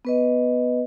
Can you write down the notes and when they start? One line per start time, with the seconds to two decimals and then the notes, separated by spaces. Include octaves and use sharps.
0.05 B3 B4 D#5